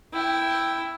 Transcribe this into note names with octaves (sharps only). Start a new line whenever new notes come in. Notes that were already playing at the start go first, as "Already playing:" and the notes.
E4 G5